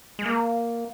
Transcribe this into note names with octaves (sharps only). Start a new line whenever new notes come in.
G#3
A#3